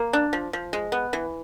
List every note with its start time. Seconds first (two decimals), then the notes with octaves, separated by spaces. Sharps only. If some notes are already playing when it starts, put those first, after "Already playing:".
Already playing: A#3
0.13 D4
0.33 F3
0.53 F3
0.73 G#3
0.92 B3
1.13 E3